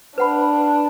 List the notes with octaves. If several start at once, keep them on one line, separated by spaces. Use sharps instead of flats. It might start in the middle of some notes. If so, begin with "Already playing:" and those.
D4 B4 F#5 B5